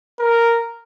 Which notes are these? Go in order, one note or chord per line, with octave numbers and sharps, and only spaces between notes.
A#4